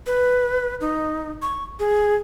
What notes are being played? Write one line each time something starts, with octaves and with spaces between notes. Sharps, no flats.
B4
D#4
C#6
G#4